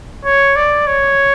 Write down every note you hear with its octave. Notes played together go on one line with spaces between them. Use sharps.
C#5
D5
C#5